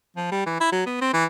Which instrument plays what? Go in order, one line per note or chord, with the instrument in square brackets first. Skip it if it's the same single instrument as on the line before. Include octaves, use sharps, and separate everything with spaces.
[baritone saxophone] F3
G3
E3
E4
F#3
B3
C4
E3